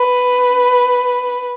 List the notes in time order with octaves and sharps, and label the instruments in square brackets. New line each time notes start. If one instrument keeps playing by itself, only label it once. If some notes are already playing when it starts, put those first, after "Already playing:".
Already playing: [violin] B4